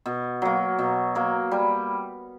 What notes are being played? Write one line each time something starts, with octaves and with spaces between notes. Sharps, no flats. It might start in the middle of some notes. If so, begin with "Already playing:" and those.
B2
F#3 A#3
B2
F#3 A#3
G3